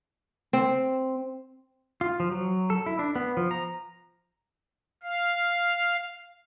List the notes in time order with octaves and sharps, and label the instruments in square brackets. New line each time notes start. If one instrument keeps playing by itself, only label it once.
[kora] C4
[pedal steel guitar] F4
F3
F#3
A4
E4
D4
B3
F3
A#5
[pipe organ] F5